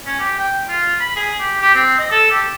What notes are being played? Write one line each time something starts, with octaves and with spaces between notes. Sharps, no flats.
C#4
G4
G5
F4
B5
G#4
G4
G4
C4
D#5
A4
G4